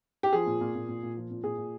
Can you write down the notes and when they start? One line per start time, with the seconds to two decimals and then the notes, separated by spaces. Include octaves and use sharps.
0.23 G4
0.33 F3 G#4
0.47 A#2
0.61 A#2
0.75 A#2
0.88 A#2
1.03 A#2
1.17 F3
1.31 A#2
1.44 A#2 G#4
1.58 A#2